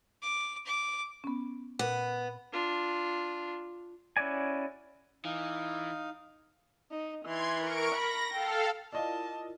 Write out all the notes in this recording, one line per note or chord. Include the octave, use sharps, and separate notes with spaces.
D6
D6
B3 C#4
A#2 B3 A#4
D4 F4
C#4 E4 F#4 D5 G#5
E3 D#4 F5
D#4
E3 C6 G#6
A#4 C#6 D7
B5 A#6
A4 F5 G5
E4 F4 A#4 D5 D#5 F5 A5